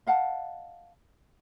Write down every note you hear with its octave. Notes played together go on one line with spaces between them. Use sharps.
D#5 F5 F#5 A5